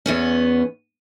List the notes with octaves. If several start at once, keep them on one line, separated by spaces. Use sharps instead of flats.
E2 B3 C#4